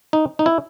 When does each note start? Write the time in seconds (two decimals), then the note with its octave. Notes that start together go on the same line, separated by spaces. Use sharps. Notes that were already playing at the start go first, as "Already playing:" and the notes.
0.13 D#4
0.39 D#4
0.46 E4